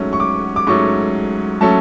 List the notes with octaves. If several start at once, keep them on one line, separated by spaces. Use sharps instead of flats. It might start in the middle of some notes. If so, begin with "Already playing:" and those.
Already playing: G#2 F#3 A3 C#4
C#6
D6
D6
G#2 F#3 A3 C#4 C#6
F#3 A3 C#4 A5